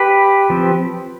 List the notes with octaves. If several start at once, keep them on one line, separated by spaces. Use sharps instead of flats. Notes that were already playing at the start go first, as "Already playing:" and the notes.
Already playing: G4 B4
F3 C4